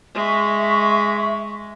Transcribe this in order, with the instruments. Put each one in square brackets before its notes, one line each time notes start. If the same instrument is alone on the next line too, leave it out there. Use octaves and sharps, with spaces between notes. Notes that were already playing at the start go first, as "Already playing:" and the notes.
[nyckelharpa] G#3 [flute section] E5 C#6